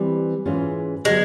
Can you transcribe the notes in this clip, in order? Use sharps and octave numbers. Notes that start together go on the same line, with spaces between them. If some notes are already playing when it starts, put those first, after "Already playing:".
Already playing: E3 G3 C4
G#2 E3 G#3 C#4 F4
D3 F#3 G#3 B3